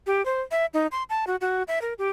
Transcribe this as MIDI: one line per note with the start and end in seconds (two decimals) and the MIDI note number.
0.07 0.24 67
0.26 0.41 72
0.51 0.66 76
0.74 0.87 63
0.92 1.03 84
1.10 1.25 81
1.27 1.36 66
1.41 1.63 66
1.68 1.81 76
1.82 1.94 70
1.98 2.10 67